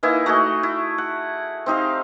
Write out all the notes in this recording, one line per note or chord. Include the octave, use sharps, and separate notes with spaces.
E3 A#3 D#4 E4
A3 F#4 G#4 D#5
E4
F#5
C4 D#4 G4 F5